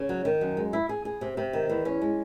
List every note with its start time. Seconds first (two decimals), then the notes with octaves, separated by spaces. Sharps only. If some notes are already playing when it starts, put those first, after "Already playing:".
Already playing: C#3
0.09 F#3
0.25 D#3
0.41 F#2
0.57 G#3
0.73 E4
0.89 G#4
1.05 G#4
1.21 C3
1.37 C3
1.53 D#3
1.69 E2
1.85 C#4
2.01 G#3